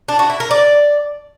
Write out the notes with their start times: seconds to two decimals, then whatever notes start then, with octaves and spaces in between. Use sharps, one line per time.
0.08 D4
0.19 F#4
0.30 E4
0.40 A#4
0.51 D5